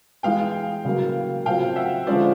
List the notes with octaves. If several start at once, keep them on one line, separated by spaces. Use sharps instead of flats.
E3 G#3 B3 F5 G5
C#3 F#3 A#3
C#3 F#3 A3 C4 F4 F5 G5
E5 F#5
D3 F3 G#3 C#4 F4 C5 D5